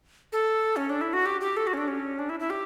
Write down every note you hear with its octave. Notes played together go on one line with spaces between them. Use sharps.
A4
C#4
D4
E4
F#4
G4
G4
A4
F#4
C#4
D4
C#4
D4
E4
E4
G4